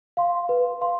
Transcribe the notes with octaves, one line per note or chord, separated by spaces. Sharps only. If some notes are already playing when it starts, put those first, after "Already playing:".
F5 C6
B4
F5 C6